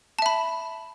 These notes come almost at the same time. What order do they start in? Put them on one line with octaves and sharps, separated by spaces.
A5 E5 B5